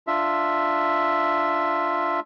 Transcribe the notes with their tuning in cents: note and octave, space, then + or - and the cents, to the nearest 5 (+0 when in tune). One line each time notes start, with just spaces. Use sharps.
D4 +10 F4 +0 E5 +5